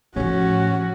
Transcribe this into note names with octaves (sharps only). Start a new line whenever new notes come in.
A2 F3 C#4 F#4